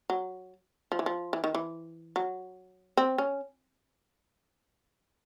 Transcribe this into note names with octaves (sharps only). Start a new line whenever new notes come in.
F#3
F3
E3
F3
E3
D#3
E3
F#3
C4
C#4